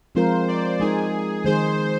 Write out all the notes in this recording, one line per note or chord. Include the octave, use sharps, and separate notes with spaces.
F3 G#3 C4 F4 A#4 C5
D5
G#3 D#4 G#4 A#4
D#3 G#3 D#4 G#4 C5